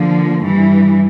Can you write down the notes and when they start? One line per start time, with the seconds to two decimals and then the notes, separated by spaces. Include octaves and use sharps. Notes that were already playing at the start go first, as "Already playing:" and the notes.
Already playing: D3 F3 A#3
0.42 G2 E3 G3